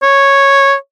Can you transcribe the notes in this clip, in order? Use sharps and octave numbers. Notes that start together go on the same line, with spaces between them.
C#5